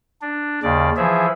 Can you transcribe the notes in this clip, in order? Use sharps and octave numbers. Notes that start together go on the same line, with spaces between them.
D4
D#2 C#3 D5
E3 F3 G#4 E5